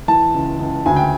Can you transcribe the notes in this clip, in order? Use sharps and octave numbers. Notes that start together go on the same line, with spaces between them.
E3 A5
C#2
C#2
D2 G#5
G5